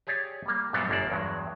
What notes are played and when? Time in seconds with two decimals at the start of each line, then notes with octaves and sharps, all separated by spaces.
0.07 G4 G#4 C#5 D5 E5
0.46 G3 A#3
0.73 F#2 A#2 F#3 G3 B3 C4
0.89 G1 F#2 A#3 D4 A4 D5
1.10 E2 G2 F#3 G#3